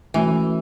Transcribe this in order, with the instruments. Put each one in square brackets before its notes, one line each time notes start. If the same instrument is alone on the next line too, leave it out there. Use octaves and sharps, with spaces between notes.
[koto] E3 [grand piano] A3 C#4 F#4